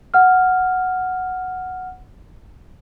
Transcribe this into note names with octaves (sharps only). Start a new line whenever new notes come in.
F#5 F6